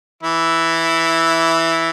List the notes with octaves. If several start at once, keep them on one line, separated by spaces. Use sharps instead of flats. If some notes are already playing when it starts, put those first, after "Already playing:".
E3 E4